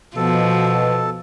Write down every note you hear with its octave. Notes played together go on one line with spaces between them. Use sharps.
B2 F3 A4